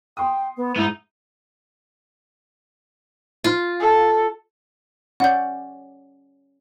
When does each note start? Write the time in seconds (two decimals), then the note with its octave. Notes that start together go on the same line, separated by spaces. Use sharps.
0.17 G5 C6 D#6
0.57 B3
0.76 G#2 B3 D#4 E4
3.44 F4
3.80 A4
5.20 C#4 D5 F#5 G6